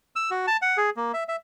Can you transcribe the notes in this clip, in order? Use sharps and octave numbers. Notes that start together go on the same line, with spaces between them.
E6
F#4
A5
F#5
G#4
A#3
E5
E5